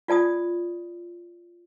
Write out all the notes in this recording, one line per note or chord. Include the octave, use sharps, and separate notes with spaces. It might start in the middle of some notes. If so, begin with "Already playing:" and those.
F4 D5 A5 D#6